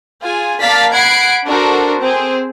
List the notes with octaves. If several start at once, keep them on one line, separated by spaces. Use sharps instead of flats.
F4 G#4 G#5
A#3 D5 F5 A5 A6 B6
F#5 B5 G#6 C7 D7
D4 F#4 A4 A#4 C5
C4 G#4